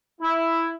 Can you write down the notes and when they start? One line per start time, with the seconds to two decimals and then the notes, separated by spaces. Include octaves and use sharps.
0.22 E4